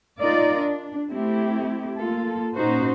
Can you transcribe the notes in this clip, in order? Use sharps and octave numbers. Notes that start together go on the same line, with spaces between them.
D#4 F4 A#4 D5 D#5
D4
A3 C4 E4 G4
A#3 F4 A4
A#2 C#4 D#4 F#4 C5